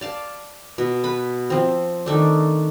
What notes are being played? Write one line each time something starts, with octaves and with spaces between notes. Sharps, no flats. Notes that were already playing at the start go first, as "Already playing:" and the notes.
D5 F5 A5
B2
B4 B5
F3 C4
D#3 A3 D4